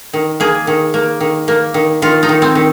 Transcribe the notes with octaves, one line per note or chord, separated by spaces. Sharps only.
D#3
A#3 G#4
D#3
A#3
D#3
A#3
D#3
D#3 F4
D#4
D#3
C4
D#3